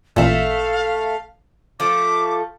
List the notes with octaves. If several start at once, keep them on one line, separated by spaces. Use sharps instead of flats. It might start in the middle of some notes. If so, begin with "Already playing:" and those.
A1 A#2 A3 E5 F5
F3 A3 D6